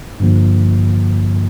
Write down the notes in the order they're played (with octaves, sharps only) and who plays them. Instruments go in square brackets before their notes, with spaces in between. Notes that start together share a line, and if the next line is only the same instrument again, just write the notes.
[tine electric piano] G2 D3 F3 A#3